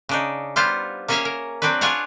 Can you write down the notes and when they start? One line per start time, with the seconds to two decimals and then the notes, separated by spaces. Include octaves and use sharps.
0.09 C#3 D4 D#4
0.56 G3 B3 F4 C5 F5
1.08 A#3 C#4 G#4 C#5 E5 F5
1.25 A#4
1.62 F#3 C4 D4 F#4 B4
1.81 D4 F4 G#4 C#5 F5 F#5